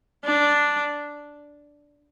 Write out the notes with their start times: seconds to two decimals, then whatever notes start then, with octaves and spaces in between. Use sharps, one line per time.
0.25 D4